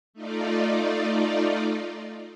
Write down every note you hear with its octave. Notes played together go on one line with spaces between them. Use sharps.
A3 D#4 F4 D5